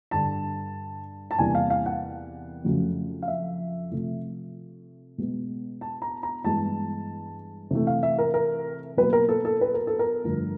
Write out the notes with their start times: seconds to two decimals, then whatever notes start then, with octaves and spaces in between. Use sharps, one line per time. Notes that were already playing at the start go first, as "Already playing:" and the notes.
0.11 G2 D3 G3 A5
1.31 A5
1.39 E2 C3 E3 G3 A#3 G#5
1.55 F5
1.70 F5
1.86 F#5
2.64 F2 C#3 F#3 A3
3.22 F5
3.28 E5
3.91 C3 F3 A3
5.18 B2 G#3 B3
5.81 A5
6.02 A#5
6.23 A#5
6.44 G2 E3 G#3 B3 A5
7.71 C3 E3 A3
7.87 F5
8.03 E5
8.19 A#4
8.34 A#4
8.97 B2 F#3 A#3 B4
9.13 A#4
9.29 A4
9.45 A4
9.61 B4
9.74 A#4
9.87 A4
9.99 A#4
10.24 G2 D3 F3 A3